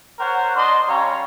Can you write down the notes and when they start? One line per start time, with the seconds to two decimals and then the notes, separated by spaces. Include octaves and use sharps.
0.19 A#4 C5 C#5 F#5
0.56 D4 D#5 C6
0.88 G3 C#4 C#5 F5 A#5